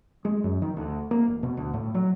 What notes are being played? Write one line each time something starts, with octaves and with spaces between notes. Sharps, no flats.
G#3
F#2
D#3
D2
A#3
E1
B2
D2
A2
F#3